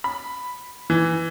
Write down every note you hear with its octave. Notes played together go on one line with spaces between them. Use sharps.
B5
E3